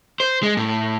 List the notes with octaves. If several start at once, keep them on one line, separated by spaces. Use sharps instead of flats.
C5
G#3
A2